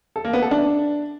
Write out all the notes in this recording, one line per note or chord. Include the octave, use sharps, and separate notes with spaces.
A4
A#3
B3
A4
D4